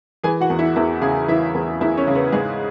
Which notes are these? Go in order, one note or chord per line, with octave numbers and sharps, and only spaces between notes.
E3 G#4 G#5
F#4 F#5
E2
E4 E5
E2 E4 E5
C#3 G#4 G#5
E3 E4 E5
E2
E2 E4 E5
C#4 C#5
C#3
B3 B4
G#2 G#3 G#4